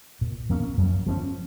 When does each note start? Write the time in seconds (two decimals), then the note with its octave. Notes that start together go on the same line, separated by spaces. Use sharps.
0.21 A#2
0.50 F3 A#3 C#4
0.78 F#2
1.06 F3 A#3 C#4